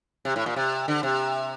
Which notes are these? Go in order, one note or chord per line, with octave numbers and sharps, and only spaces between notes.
C3
A2
A#2
C3
D3
C3